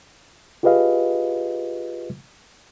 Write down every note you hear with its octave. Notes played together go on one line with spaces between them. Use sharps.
F4 G4 G#4 B4 D#5 F5